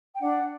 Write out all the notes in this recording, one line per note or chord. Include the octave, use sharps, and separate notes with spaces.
G5
D4 F#5